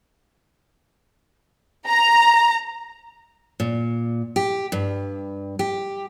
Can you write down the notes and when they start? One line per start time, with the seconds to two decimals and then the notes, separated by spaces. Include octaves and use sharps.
1.87 A#5
3.60 A#2
4.36 G4
4.72 G2
5.59 G4